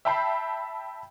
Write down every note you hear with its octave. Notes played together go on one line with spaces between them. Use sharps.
E5 G5 A5 B5 G6 C7